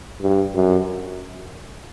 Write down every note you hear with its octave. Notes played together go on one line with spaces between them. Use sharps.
G2
F#2